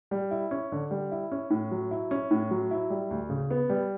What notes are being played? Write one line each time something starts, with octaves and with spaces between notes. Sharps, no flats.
G3
E4
C#4
D3
G3
E4
C#4
A2
F#3
E4
C#4
A2
F#3
E4
G3
D2
C#3
B3
G3